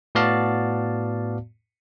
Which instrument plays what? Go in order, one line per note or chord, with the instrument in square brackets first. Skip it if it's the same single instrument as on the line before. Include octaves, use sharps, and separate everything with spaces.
[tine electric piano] A2 B3 F#4 D5 F5 A5